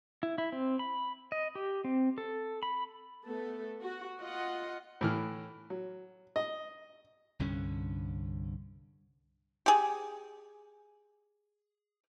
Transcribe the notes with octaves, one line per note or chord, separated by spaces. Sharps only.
E4
E4
C4
B5
D#5
G4
C4
A4
B5
A3 B3 A4
F#4
F4 D#5 F#5
A2 E3 F6
F#3
D#5
C2 G2 D3 C#4
G4 G#4